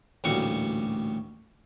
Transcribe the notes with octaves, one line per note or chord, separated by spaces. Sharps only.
A1 D2 A#2 G3 F#4 C#6